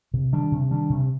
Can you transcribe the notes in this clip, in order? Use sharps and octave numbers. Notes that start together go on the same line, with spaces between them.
C3
D#3 G3 D4
C3
D#3 G3 D4
C3